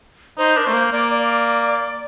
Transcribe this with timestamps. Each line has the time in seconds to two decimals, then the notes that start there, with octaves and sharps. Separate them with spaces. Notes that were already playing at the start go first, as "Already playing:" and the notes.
0.38 D#4 C5
0.56 D4 A#4
0.65 A3 C5
0.73 A#3
0.92 A#3 D5
1.19 D5